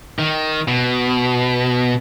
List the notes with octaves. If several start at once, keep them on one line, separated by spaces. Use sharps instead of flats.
D#3
B2